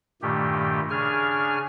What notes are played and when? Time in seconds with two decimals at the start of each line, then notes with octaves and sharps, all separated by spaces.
0.22 G2 A#2 D#3 A3 G4
0.90 C#3 D4 G#5 F6